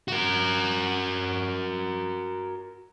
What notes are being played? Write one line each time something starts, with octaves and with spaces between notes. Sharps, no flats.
F#4 A#4